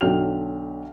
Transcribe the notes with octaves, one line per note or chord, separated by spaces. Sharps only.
B1 D3 F#3 G5 F6 F7